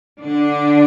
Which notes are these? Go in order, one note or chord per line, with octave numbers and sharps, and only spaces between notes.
D3 D4